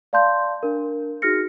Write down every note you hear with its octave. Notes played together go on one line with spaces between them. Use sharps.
D5 F5 A5 C6 G6
D4 A#4
D#4 F#4 G#4 F6 A#6 C#7